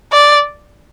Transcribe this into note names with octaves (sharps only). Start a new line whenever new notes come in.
D5